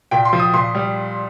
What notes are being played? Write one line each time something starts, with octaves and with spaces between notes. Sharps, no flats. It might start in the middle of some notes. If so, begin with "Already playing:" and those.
A#2 G5
C6
F3
D#6
A#2 C6
G3